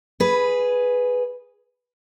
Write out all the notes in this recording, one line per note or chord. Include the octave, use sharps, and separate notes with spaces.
G#4 B4